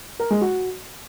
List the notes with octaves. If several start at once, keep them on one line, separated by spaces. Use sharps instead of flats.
A#4
G#3
F#4